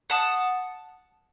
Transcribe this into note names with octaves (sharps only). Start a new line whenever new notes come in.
F#5 A5 D#6